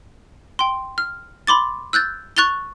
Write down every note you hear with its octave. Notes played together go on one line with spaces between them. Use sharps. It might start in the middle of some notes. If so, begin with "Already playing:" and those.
G5 C6
F6
B5 C6 D6 A6
E6 F#6 G6 A6
C#6 F#6 A6 F7 G7